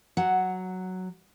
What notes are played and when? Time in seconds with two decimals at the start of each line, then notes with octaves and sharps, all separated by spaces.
0.17 F#3 F#5